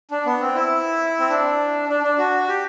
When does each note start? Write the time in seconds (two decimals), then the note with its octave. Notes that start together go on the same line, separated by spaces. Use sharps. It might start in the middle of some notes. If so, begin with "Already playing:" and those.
0.11 D4
0.26 B3
0.41 C4
0.55 E4
1.19 C4
1.30 D4
1.89 D4
2.04 D4
2.18 F#4
2.48 G4